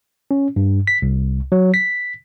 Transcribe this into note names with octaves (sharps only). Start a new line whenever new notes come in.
C#4
G2
B6
C2
F#3
B6